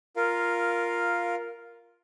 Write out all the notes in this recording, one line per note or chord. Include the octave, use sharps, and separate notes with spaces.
F4 A#4 F5